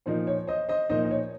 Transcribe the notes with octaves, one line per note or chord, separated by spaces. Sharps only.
A#2 F3 A#3 D#4 C5
C#5
C5 D#5
C5 D#5
A#2 F3 A#3 D#4 C5 D#5
D#5
C#5